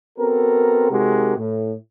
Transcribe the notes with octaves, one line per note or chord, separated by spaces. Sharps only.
B3 C4 F#4 A4 A#4
C3 G#3 D#4 F#4 G4 A#4
A2